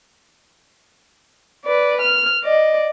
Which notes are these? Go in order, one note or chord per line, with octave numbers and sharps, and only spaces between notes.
B4 D5
F6
D5 D#5